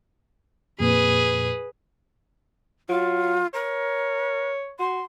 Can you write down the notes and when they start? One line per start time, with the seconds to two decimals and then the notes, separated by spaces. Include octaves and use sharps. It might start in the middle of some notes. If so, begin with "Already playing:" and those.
0.80 F2 A#2 G#4 B4
2.89 F#3 F4
3.54 A#4 C#5
4.80 F#4 C6